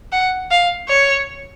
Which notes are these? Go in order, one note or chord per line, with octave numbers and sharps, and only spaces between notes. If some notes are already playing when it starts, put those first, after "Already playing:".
F#5
F5
C#5